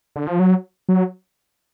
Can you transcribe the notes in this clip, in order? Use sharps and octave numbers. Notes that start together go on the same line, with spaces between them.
D3
F3
F#3
F#3